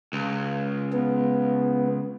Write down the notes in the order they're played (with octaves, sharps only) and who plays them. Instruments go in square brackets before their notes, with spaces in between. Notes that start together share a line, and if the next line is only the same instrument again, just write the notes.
[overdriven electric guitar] C#2
[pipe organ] B3